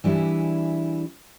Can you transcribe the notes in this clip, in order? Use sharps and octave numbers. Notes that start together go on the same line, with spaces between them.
E3 G3 D4 E4 G#4